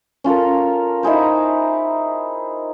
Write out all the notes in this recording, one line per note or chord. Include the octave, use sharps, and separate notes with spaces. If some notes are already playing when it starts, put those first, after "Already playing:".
C#4 F4 A4 A#4
D#4 E4 G#4 C5